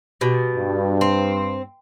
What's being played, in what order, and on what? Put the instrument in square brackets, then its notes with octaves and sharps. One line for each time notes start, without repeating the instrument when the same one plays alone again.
[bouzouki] B2 G3
[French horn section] G2
[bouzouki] C4